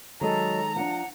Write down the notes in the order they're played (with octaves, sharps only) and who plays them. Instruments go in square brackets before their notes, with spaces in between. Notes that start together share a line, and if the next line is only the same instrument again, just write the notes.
[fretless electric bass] D#3 G#3 [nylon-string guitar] F#3 D#5 [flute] A4 [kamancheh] A#5
[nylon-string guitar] F3 D4 [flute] F#5